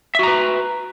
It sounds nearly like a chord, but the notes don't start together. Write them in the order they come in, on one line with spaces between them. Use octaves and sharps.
E5 F#4 A#5 B4